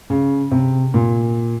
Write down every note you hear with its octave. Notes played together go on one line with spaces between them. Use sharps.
C#3
C3
A#2